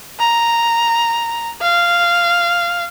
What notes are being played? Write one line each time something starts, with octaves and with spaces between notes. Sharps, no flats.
A#5
F5